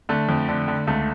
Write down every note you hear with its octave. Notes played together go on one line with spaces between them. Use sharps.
D3 A3
F2
D3
D3
C#2 A3